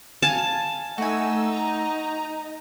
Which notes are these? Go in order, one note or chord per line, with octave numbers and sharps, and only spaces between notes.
F5 G#5 A5
A3 D#4 F#4 G#5 E6
A#5